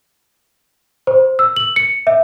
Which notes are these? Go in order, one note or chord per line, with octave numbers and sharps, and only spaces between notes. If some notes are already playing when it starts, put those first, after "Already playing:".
C5
E6
F#7
C#7
E5